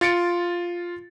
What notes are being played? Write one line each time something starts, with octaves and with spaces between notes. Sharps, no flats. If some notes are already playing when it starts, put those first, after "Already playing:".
F4 A6 C#7 D7